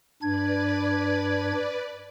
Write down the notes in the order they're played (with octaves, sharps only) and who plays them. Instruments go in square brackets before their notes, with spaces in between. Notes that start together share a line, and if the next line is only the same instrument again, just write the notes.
[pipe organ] G2 D4 G#6 [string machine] B4 D5